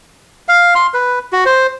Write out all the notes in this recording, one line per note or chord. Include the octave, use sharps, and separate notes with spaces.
F5
C6
B4
F#4
C5